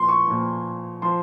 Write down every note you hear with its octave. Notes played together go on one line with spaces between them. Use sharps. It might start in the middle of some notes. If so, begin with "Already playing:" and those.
Already playing: A#2 F3 C6
C#6
A#2 F3
F3 C6